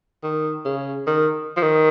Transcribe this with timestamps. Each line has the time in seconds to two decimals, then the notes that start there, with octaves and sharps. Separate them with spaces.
0.23 D#3
0.65 C#3
1.07 D#3
1.57 F3
1.63 D#3